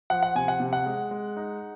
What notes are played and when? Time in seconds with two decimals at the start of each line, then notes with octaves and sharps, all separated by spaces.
0.10 F3 F#5
0.23 F#5
0.35 C3 G#5
0.48 F#5
0.60 C3
0.73 F#5
0.86 G#3
1.11 G#3
1.37 D#4